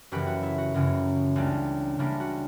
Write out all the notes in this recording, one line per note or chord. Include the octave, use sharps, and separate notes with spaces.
F#1 F#2 C#3 E3 G4 B4
F#4
E4
F#4
F#1 F#2 C#3 E3
C#2 C#3 G3 A#3 D4
C#2 C#3 G3 A#3 D4 E4
F#4